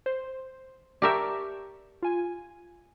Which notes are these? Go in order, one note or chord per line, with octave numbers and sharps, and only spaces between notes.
C5
G4 A#4 D5 E5 A5 C#6
F4 G#5